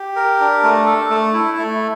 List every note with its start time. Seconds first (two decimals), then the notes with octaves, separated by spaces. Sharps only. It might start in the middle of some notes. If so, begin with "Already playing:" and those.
Already playing: G4
0.16 A#4
0.40 D4
0.63 A3
0.87 A4
1.10 A3
1.33 E4
1.58 A3